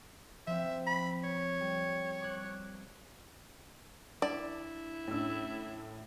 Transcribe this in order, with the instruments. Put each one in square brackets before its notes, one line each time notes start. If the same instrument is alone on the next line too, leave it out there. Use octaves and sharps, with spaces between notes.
[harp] F3 C4 [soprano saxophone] E5
[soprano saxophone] B5
C#5
[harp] G3
D6 F#6
[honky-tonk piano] D4 [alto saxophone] E4 [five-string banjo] D5
[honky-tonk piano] A2 E6 [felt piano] C#4 D4